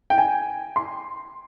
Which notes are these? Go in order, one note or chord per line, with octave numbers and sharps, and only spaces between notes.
G5
G#5
C6